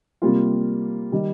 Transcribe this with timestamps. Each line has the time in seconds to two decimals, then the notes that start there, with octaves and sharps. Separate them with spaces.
0.22 C3 G3 A#3 F4
1.12 D#3 G3